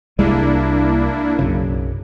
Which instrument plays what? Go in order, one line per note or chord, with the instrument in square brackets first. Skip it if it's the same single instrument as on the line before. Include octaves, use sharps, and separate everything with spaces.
[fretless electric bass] C2 G3 G#3 [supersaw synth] A#3 D4 E4
[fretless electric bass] B1 F#2 C#3